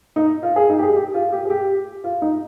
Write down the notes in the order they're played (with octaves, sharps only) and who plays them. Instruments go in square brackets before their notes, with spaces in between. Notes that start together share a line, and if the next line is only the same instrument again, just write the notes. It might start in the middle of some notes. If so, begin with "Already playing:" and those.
[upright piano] D#4
F4
G#4
D#4
G4
G#4
G4
F4
G4
G#4
G4
F4
D#4